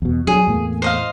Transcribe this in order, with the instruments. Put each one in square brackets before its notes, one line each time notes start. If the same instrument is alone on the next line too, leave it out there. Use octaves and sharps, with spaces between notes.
[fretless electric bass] E2 B2
[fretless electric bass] F#3 D4 [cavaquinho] G#4
[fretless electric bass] E2 A2 A#3
[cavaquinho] C5 D#5 F5